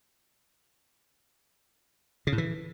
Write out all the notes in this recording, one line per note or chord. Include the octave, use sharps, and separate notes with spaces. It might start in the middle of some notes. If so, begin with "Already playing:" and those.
C#3
A2
E3